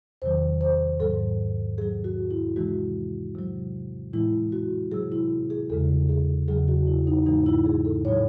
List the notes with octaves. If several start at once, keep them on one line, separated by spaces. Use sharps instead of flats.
E2 C3 D#3 F#3 C5
C5
G#2 F#3 A4
C3 F#3 G#4
F#4
E4
C3 E3 G#3 F#4
C3 F#3
A2 E3 G#3 E4
F#4
C3 F#3 G#4
E4
G#4
E2 C#3 G#3 A4
G#4
E2 C#3 F#3 G#4
F#4
E4
D#4
G#2 E3 G#3 D#4
E4
G#4
A4
A2 F#3 C#5